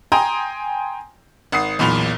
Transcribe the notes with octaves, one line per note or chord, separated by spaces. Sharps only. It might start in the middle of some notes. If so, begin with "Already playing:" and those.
G5 G#5 A#5 C6 D#6
G#1 F#5 D#6 C7
B1 E2 A#2 B5 F7